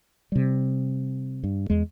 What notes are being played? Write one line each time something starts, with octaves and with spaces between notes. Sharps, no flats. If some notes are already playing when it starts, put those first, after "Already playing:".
C3 G3
G2
E2 G#3